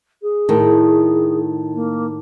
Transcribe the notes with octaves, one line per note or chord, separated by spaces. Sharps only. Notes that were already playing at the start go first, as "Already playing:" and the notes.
G#4
A2 D#3
A#3